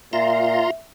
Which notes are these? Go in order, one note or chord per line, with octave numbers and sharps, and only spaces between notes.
A#2 F4 E5 A#5 C6